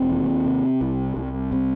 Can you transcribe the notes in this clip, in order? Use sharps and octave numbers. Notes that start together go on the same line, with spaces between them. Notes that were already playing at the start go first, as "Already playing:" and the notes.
Already playing: E1 C4
D#2
C3
C2
C2
C3